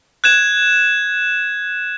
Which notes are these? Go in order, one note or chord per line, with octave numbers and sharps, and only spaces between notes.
F#6 G#6 E7